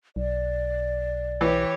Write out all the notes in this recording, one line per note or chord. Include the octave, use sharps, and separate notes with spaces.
B1 D5
E3 G4 C#5